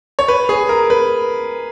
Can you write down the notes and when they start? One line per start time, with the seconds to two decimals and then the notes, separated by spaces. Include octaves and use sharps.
0.19 C#5
0.28 B4
0.49 G#4
0.69 A#4
0.90 B4